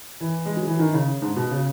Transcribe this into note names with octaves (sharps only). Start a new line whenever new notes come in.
E3
G#3
F#3
E3
D#3
C#3
G#2
B2
C#3